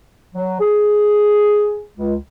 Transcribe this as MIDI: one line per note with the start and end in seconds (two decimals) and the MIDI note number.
0.35 0.58 54
0.61 1.86 68
1.95 2.16 37